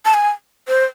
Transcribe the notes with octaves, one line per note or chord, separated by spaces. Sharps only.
A5
G#5
C5